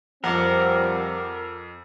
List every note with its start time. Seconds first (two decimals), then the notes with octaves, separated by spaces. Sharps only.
0.24 F2 F3 G3 C4 A#4 F#5 D6 F6